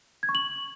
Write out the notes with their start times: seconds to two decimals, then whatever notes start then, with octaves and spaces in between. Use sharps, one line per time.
0.23 G#6
0.29 C#6
0.35 F#7